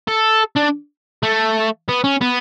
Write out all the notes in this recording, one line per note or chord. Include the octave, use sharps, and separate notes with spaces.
A4
D4
A3
B3
C#4
B3